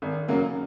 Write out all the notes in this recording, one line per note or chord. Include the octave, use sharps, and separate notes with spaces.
G#1
F#2 C#3 F#3 A#3